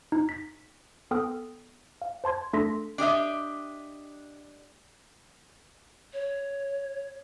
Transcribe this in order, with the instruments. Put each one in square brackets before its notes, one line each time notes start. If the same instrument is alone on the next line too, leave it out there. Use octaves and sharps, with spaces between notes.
[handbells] D#4
B6
B3 A4 G5 D#6 F6
F5
C5 A5 C6 G#6
A3 D4 A4 C6 A#6 B6
[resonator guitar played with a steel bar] D4 G4 D#5 E5
[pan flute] C#5